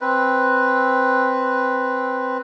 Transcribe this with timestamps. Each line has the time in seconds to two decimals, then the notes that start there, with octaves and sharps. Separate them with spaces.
0.01 C4 B4